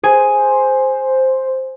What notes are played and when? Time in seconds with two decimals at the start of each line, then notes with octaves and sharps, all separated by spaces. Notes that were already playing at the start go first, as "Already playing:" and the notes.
0.03 G#4 C5 G#5
0.31 C5